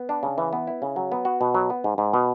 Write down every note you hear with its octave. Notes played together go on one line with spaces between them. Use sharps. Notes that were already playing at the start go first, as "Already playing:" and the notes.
Already playing: B3
D4
C#3
E3
B3
E4
C#3
F#3
B3
F#4
B2
F#3
B3
G#2
G#2
B2